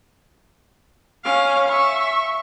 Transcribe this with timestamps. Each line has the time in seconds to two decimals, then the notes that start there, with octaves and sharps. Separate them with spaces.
1.24 C#4 F5
1.68 E5 C#6